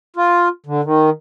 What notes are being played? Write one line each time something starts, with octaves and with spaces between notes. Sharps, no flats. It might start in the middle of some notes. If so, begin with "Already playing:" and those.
F4
D3
D#3